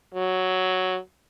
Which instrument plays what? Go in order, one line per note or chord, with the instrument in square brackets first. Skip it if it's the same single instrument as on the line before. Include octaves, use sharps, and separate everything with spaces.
[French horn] F#3